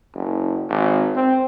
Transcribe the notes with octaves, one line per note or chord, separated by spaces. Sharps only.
F#1
G#1
C4